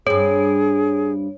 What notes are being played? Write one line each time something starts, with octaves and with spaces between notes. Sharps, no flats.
G2 C4 G#4 C#5